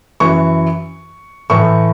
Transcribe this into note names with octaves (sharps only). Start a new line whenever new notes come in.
F#2 E3 C#6
A2 E3 C#6